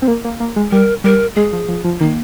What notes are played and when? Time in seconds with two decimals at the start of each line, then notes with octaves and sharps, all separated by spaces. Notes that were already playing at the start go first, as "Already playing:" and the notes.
0.02 C4
0.08 A#3
0.25 A#3
0.40 A#3
0.56 G#3
0.72 G3 A#4
1.04 G3 A#4
1.36 G#3 G#4
1.53 F3
1.68 F3
1.84 F3
2.00 D#3 A#3